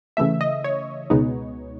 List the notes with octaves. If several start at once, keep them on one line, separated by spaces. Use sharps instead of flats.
C#3 E3 A3 E5
D#5
C#5
C#2 B2 G#3 B3 D#4